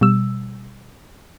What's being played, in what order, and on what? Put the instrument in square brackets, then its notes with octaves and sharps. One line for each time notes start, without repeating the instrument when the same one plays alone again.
[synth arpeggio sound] B2 G3 E6